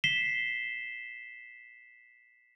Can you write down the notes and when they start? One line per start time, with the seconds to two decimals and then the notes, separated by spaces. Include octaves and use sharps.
0.04 B6 C7 E7 G7